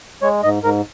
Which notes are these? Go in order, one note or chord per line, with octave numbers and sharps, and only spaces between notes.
G#3 C#5
G#2 D#5
G#2 A#4